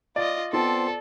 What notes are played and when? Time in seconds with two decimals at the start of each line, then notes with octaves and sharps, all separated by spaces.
0.16 F4 D5 D#5
0.53 B3 C4 F4 A4 C5 A5 C6